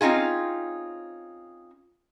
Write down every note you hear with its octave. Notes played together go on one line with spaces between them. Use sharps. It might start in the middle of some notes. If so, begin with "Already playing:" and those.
C4 C#4 D#4 F4 G#4